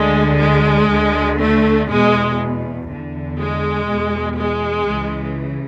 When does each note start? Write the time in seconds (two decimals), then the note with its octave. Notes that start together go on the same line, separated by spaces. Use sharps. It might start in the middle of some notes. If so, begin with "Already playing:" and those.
Already playing: D2 D3 G#3
0.39 G#3
0.89 D2 D3
1.39 A3
1.89 E2 B2 G#3
2.89 E2 D3
3.39 G#3
3.88 E2 B2
4.38 G#3
4.88 C#2 C#3 E3